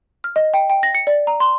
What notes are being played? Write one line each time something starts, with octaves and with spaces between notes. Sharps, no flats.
F6
D#5
G5
G5
A#6
C#7
D5
A#5
C6